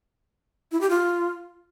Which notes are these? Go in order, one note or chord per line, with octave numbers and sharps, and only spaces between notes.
E4
G4
F4